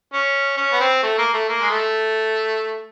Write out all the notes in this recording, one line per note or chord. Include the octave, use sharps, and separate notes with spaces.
C#4
C#4
B3
C4
A3
A#3
A3
A#3
G#3
A3